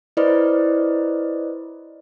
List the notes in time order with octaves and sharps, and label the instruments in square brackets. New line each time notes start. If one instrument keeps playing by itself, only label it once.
[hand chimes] E4 B4 C5 D5 D#5